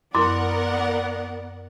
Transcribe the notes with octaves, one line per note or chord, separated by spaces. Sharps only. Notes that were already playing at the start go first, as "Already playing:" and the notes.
F#2 B3 E4 A#4 D5 F#5 C6 D6